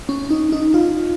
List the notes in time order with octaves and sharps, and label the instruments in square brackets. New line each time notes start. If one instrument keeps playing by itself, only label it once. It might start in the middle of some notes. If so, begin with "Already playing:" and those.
[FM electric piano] C#4
D#4
D#4
F4